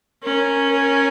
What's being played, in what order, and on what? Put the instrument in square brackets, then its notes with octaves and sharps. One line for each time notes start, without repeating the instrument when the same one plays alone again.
[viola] C#4 [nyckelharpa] A#4
[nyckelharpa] A#4